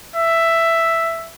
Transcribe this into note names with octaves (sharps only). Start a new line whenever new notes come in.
E5